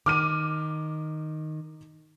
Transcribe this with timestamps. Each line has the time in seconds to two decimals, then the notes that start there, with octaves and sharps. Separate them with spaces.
0.06 D#3 D6 F6 D#7